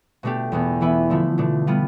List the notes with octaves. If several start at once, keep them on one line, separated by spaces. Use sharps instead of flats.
B2 A3 D4 G4
E2 B2 B3
E3 B3 E4 B4
D3 F3 A3 E4
B2 A3 D4
G3 B3 F4